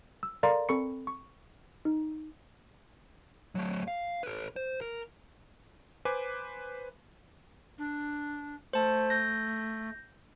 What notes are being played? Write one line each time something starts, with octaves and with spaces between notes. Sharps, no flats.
E6
A4 A#4 D5 F5 A#5 C6
C4 A4 B5 C#6 C#7
C#6
D#4
F#3 A3
F5
A4 B4
C5
A#4
B4 C5 G#5 D6
D4
A3 C5 A5
G6 A#6